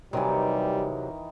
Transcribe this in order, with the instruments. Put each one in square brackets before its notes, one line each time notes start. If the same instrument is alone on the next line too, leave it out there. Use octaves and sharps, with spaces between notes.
[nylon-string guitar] C3 F#3 [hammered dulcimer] D#3 E3 [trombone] G3